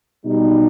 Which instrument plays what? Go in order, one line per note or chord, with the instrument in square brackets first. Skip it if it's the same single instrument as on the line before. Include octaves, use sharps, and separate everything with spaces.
[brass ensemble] B2 G3 D#4